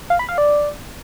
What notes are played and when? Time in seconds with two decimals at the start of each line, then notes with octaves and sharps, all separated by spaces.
0.10 F5
0.19 B5
0.29 F5
0.38 D5